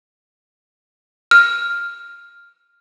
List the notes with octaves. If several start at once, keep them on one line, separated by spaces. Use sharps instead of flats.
F6